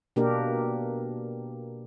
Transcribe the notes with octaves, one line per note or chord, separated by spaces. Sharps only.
B2 A#3 D4 G4 A#4